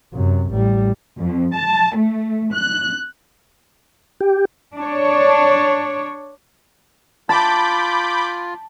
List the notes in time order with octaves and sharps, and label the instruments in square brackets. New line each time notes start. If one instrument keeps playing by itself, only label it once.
[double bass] F#2 C3
A1 G3
[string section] F2
A5
A3
F#6
[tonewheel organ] G4
[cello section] D4 C#5
[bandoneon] F4 [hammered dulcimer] A5 [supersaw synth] B5 D6 G6